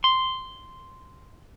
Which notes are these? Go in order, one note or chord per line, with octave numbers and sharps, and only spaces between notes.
C6